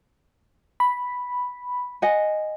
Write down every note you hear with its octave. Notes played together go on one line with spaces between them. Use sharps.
B5
D#5 F#5 G#5